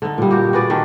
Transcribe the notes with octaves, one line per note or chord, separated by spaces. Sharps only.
D3 D#4
A#2 G3
F#4 G4
F#4 G#4 B4 D5
D#3 C#4 D4